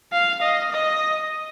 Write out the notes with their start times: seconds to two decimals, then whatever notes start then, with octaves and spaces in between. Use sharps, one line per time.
0.12 F5
0.42 D#5
0.71 D#5